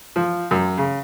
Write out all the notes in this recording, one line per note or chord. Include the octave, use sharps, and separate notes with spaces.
F3
F#2
C#3